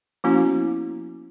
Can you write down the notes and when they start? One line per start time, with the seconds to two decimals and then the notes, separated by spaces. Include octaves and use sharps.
0.24 F3 A#3 B3 C#4 E4 F#4